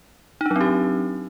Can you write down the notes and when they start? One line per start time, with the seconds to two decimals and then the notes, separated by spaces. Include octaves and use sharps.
0.41 D#4
0.46 D4
0.51 F#3
0.56 C4
0.61 G4